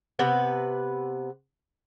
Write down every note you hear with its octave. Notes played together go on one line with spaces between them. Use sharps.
C3 B3 B4